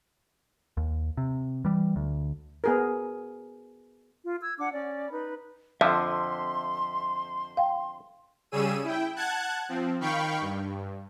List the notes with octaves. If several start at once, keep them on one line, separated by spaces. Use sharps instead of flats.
D#2
C3
E3 G3
D2
B3 G#4 A#4
F4
E6 G#6
D4 F#5 D6
C#4 D5
D#4 B4 B5
F2 D3 F3 E5 C6
F5 G5
C#3 G3 C#4 G#4 E6 D#7
E4 G5
F#5 A5 F#6 G#6
F3 C4
D#3 F5 G5 B5 C#6
G2